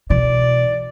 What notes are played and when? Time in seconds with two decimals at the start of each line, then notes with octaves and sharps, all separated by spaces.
0.10 B2 E3 D5